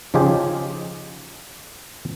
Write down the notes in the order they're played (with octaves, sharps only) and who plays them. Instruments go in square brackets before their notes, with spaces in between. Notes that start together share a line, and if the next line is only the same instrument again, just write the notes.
[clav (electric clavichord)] C#3 F3 D#4 F4 G4 G#4